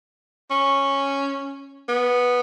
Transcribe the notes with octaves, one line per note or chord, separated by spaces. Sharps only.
C#4
B3